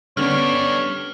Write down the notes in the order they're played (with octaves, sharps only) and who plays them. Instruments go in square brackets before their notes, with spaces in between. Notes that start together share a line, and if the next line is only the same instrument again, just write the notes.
[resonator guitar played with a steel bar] D3 B3 C#4 [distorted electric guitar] G3 D4 [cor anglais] C#5 [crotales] F6